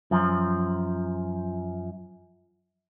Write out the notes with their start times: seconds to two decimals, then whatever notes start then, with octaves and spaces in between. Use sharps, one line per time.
0.11 F#2 F3